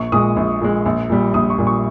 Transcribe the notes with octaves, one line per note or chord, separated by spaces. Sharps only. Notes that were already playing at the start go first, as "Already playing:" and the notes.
Already playing: A#1 C#6
A#2 G#3 D#6
A#1
A#2 G#3
A#1
A#2 G3
A#1 D#6
C#6
A#2 G3
C#6